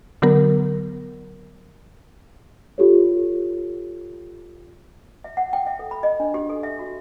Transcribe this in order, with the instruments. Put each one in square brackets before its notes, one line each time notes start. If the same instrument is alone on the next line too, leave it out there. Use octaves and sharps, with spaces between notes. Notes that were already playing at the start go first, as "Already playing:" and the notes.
[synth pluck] D3 F#3 B3 A#4
[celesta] F4 G4 A4 C#5
[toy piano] E5
F#5
G5
E5
A4
B5
D#5
D4
G4
A4
E5
F#4